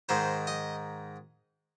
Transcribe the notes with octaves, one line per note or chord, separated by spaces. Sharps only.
G#2 D#3 C5
D#5